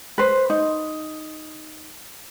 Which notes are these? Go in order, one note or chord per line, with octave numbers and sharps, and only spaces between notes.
B4 C5
D#4